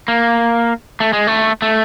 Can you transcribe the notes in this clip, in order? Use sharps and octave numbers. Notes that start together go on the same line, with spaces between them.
A#3
A3
G#3
A3
A3